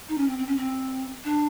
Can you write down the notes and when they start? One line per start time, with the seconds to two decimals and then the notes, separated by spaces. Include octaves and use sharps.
0.09 D#4
0.18 C#4
0.28 C4
0.38 C4
0.47 C#4
0.57 C4
1.25 D4